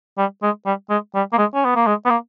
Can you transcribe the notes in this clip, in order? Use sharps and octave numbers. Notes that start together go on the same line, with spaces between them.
G3
G#3
G3
G#3
G3
A#3
G#3
C#4
B3
A#3
G#3
B3
A#3